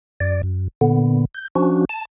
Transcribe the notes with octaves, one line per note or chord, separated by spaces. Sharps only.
F#2 D5
F#2
A#2 D3 B3
G6
F3 C#4 D4 F#4
A5